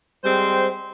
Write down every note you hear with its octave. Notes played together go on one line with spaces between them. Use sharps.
G3 G#3 C4 C5